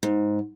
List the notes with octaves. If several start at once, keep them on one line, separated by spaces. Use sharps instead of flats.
G#2